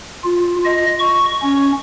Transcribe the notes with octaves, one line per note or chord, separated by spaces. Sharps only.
F4
D#5
C#6
C#4